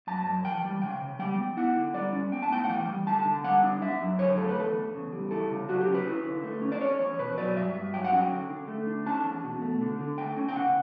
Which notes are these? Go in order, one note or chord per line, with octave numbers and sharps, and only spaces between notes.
F#2 A5
F#2
E3 G5
G3
C#3 G5
C#3
G3 G5
B3
E4 F#5
D3
G3 D5
C#4
B3 G5
A5
A2 G5
F#5
E3 G5
G3
D3 A5
D3
G3 F#5
D4
D4 E5
F#2
D3 C#5
A3 A4
B4
E2 A4
E2
C#3
G3
E4 A4
C#3
F#3 F#4
G4
C#4
B4
E4
D3
A3
C#4
D5
C#4 C#5
E2 C#5
B2 B4
F#3 D5
G2 E5
G2
F#3 G5
F#5
C#4 G5
D3
D3
A3
D4
C#4 A5
E2
B2
A3
D3
D3
A3 G5
C#4
G5
C#3 F#5